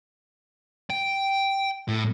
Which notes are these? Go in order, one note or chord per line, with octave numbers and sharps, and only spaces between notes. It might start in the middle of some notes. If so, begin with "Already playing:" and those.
G5
A2